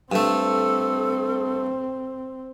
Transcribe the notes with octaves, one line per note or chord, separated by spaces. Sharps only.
G2 A3 C4 A4